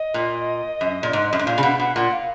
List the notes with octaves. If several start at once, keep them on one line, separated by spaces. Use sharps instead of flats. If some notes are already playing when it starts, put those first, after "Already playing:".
Already playing: D#5
A#2
F#2
A#2
G#2
F#2
G#2
A#2 F5
C#3
B2 F#5
B2 F#5
A#2 F#5
F5